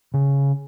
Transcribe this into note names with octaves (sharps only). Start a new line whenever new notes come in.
C#3